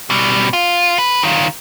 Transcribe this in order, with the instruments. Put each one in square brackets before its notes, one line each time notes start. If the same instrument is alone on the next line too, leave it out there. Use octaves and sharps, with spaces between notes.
[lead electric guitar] B2 G3
F4
B4
D#3 F4